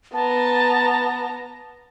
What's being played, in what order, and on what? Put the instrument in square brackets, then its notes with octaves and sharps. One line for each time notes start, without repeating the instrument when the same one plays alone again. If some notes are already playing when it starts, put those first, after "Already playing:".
[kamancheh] B3 A#5 [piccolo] A5